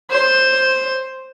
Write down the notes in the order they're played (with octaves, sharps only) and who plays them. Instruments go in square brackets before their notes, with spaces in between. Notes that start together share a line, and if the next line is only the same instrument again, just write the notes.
[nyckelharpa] C5